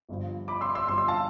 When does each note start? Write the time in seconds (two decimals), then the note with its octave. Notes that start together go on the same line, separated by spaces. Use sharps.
0.09 G1 G2 F3
0.48 B5 D6
0.61 C6 E6
0.75 C6 E6
0.87 G1 G2 F3 C6 E6
0.98 C6 E6
1.08 F5 A5